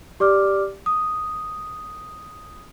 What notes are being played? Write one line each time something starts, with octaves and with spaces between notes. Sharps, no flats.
G4 D5 D6 F6
D#6